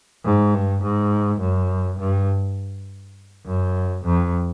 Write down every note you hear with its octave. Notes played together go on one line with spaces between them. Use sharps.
G#2
G2
G#2
F#2
G2
F#2
F2